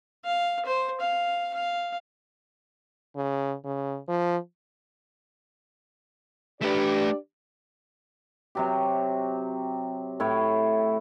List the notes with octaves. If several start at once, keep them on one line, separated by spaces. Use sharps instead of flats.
F5
C5
F5
F5
C#3
C#3
F3
A3 D4 G4 B4 D5
C3 F#3 G4
A2 E4 C#5